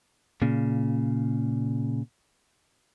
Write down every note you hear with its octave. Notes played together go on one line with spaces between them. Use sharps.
A#2 C#3